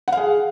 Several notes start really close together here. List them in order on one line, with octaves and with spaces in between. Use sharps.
F#5 F5 G#4